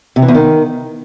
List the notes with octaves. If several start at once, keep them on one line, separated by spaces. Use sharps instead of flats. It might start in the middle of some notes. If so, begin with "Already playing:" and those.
C3
E3
E2
D#3